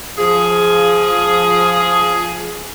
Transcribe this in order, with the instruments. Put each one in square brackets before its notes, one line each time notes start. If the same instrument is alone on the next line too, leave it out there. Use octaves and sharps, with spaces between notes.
[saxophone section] F3 G#4